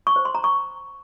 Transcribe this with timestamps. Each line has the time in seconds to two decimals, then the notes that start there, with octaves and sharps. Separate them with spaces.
0.07 C#6
0.16 C5
0.25 C6
0.35 A#5
0.44 C#6